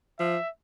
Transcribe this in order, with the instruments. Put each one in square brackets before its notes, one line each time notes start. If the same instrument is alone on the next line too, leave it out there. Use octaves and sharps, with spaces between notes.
[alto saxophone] F3 [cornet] E5